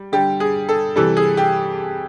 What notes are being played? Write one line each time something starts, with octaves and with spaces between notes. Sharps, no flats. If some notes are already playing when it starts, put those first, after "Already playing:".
Already playing: G3
D3 G3 G4
G#4
A4
C3 E3 G3 A4
G#4
G4